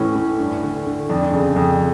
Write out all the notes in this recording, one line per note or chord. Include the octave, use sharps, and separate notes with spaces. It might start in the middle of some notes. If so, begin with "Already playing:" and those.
Already playing: A2 E3 C#4
A2
G2
D3
D3
F2 D4
C#3
F2